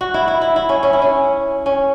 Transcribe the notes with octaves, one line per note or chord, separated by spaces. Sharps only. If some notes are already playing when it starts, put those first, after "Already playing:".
F#4
E4
E4
E4
E4
C#4
C#4
E4
C#4
C#4